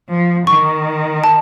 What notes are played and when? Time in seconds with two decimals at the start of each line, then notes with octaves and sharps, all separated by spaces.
0.09 F3
0.47 D#3 C#6
1.24 A5